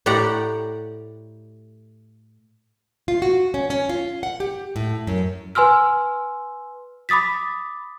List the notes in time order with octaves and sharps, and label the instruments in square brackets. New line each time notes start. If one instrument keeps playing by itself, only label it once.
[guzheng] A2 G4 D5 F#5 A#5
[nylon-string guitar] F4
F#4
C#4
C#4
F4
F#5
G4
A2
F#2
[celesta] B4 G#5 C6 E6 F6
B5 D6 D#6 A6 B6